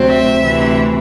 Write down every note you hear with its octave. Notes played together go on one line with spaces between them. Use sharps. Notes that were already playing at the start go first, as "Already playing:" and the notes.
Already playing: D2 C3 F#3 C4
E5
D2 C3 E3